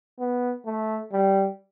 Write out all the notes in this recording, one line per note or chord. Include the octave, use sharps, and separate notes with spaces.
B3
A3
G3